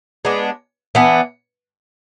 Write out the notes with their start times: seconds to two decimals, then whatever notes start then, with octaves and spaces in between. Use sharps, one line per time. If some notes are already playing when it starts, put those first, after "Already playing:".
0.25 G#3 B3 D4
0.95 E3 B3 D4